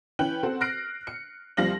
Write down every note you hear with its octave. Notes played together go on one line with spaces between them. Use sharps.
E3 C#4 B4 G5 F#6 F#7
C4 F#4 A4 C5
F6 F#6 A#6 C7 D7
C#7
C2 F3 G3 F5 A#6 F#7